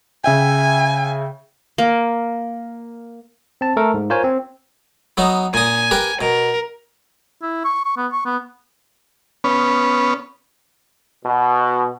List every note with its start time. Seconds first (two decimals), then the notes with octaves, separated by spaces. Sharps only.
0.24 C#3 E5 G5 G#5
1.78 A#3
3.61 C4 A5
3.77 A3 A4 A#4
3.94 G#2
4.10 F4 A#4 C5 C#5 G#5
4.24 C4
5.17 F#3 B3 D#4
5.54 A#2 G#5 D#6
5.91 G4 A#4 B4
6.21 B2 A#4
7.42 E4
7.65 C#6
7.85 C#6
7.97 B3
8.12 C#6
8.25 B3
9.44 B3 C#4
11.25 B2